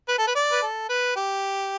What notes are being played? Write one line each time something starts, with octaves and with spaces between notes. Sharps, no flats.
B4
A4
B4
D5
B4
A4
B4
G4